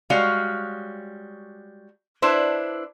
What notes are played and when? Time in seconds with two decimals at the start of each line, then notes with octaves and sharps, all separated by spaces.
0.10 G3 G#3 F#4 C#5 F5
2.22 D4 E4 B4 C5